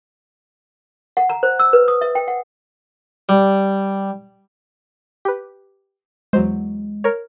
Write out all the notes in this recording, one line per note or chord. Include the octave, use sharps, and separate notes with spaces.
F#5
A#5
C5
E6
B4
D#6
E5
G5
F#5
G3
G4 B4
E2 F#3 G#3 C5
A#4 C#5